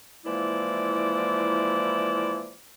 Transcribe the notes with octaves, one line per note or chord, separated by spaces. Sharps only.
E3 F3 G#3 A#3 E4 D5